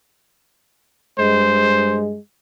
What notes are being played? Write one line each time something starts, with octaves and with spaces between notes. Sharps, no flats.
G2 G#3 C5